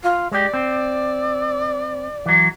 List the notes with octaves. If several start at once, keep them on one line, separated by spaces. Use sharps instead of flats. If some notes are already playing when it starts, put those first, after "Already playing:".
F4
G#3 G4 D5
C4
E3 F#3